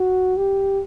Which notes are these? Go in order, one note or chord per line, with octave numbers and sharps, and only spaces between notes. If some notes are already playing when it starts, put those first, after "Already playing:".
Already playing: F#4
G4